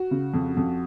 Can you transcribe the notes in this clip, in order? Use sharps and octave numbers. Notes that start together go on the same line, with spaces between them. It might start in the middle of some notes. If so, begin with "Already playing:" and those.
Already playing: F#4
C#3
F2
F2